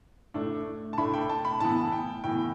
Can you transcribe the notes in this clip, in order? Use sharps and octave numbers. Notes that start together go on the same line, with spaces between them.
A2 A3 D4
A5
A2 A3 D4 B5
G5
A5
B5
A2 E3 B3 A5
G5
A2 E3 B3 G5